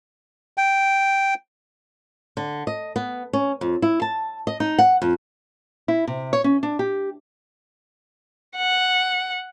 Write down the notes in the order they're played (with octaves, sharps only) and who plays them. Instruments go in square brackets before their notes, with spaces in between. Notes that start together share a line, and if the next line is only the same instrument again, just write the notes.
[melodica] G5
[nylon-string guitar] D3
D#5
B3
C#4
F2
E4
A5
D#5
D#4
F#5
F2
E4
C3
C#5
C#4
D4
G4
[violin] F#5